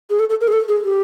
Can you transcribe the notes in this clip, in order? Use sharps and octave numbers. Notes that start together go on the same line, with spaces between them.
G#4
A4
A4
A#4
G#4
A4
G#4
G4